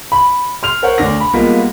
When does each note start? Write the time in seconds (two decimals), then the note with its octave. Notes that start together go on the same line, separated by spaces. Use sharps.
0.12 B5
0.63 C6 F6 F7
0.82 A#4 C5 C#5 F#5
0.98 D2 D4 A#6
1.21 B5
1.33 G3 G#3 A#3 B3 F4